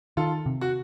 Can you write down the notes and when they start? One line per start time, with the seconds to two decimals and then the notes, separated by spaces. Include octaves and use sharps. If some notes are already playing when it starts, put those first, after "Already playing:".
0.17 D#3 F4 A4
0.46 C3
0.61 F#4